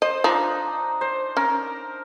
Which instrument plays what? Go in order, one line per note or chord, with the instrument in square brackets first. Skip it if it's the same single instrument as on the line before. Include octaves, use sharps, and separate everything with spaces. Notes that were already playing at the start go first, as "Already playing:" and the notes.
[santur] C5 [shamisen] D#5
[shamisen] F3 [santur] D4 D#4
[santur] C5
[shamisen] C#4 [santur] A#4